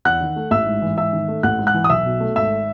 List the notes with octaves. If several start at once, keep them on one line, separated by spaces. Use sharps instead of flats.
E2 F#5 F#6
D#3
A3
A1 E5 E6
G#2
E3
G#2 E5 E6
D#3
A3
A1 F#5 F#6
G#2
F#5 F#6
E3
D#6
B1 E5 E6
B2
A3
G#1 E5 E6